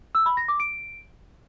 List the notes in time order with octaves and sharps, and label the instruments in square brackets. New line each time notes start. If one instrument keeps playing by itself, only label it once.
[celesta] E6
B5
A#6
D6
D7